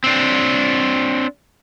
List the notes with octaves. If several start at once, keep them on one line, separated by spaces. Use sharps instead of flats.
C4 D4